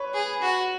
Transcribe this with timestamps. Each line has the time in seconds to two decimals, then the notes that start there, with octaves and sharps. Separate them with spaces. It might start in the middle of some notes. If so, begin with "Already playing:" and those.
Already playing: B4 C#5
0.14 G#4
0.42 F#4